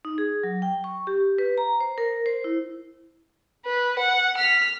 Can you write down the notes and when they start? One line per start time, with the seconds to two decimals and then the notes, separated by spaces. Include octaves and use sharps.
0.05 D#4
0.18 G#4
0.43 F#3
0.62 G5
0.84 C#6
1.07 G4
1.38 B4
1.58 A#5
1.81 C5
1.98 A#4
2.26 C5
2.44 E4
3.66 B4
3.99 F#5
4.37 F6 B6